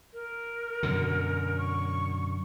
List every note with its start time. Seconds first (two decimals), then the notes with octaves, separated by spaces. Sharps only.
0.14 A#4
0.83 F#2 B2 D3
1.58 C#6